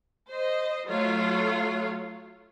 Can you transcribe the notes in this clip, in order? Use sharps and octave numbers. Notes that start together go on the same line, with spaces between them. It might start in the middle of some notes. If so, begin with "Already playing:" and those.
C5 D#5
F#3 A3 F4 C#5